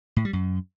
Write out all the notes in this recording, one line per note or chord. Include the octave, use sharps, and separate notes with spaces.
A2
G3
F#2